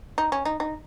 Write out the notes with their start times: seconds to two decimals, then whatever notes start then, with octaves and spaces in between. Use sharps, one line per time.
0.18 D#4
0.32 C#4
0.45 D#4
0.60 D#4